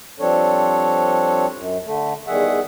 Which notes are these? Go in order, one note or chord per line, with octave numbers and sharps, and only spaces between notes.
F3 G3 C4 D4 A4 C#5
F#2
D3 A3
E2 D#3 G3 G#4 E5 F#5